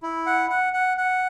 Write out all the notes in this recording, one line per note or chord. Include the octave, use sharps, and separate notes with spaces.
E4
F#5
F#5
F#5
F#5